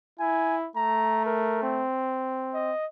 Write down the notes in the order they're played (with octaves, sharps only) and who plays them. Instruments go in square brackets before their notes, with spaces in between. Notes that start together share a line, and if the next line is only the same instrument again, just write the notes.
[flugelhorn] E4 [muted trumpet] G#5
[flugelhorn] A3 [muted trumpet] A#5
[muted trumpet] A#4
C4
[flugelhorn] D#5